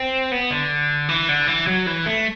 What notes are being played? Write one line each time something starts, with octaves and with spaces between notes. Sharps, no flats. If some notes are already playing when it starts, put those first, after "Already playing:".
Already playing: C4
B3
D3
E3
D3
E3
F#3
E3
A3